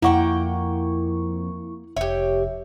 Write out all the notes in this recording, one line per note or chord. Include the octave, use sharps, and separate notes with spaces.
F2 A#3 E4 F#5 G5 C#6
F1 G4 C#5 E5